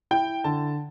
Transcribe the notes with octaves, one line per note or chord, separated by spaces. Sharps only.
E4 G5
D3 A5